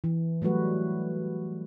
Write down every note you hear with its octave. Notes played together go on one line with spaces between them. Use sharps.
E3
F#3 G3 A3 F#4 B4